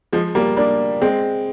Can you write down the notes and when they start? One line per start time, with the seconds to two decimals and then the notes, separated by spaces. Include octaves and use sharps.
0.13 F3 G#3
0.35 G3 A#3
0.57 A#3 D4
1.02 G#3 C4